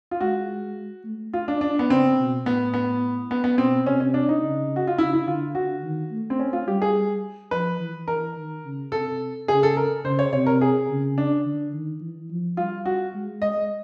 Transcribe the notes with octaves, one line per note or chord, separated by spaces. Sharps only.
F4
G#3 F#4
A3
F4
D4
D4
B3
C#3 C4
B2
A2 B3
B3
B3
B3
B2 C4
C3 C#4
C#4
D4
D#4
C#3
F#4
F4
C#3 E4
E4
D3 F4
D3 F#4
D#3
A3
C4
C#4
F4
G3 G4
G#4
F3 B4
E3
A#4
D#3
C#3
C3 A4
C#3 G#4
A4
A#4
C#3 C5
C#5
C3 C#5
A#4
G#4
C#3
D4
D3
D#3
E3
F3
G3 F4
F#4
G#3
G#3 D#5